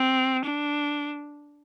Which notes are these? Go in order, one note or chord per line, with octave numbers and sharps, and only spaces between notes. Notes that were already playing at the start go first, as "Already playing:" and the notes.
Already playing: C4
D4